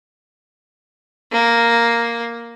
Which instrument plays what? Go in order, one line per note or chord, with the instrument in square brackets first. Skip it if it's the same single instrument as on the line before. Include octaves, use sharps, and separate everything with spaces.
[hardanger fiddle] A#3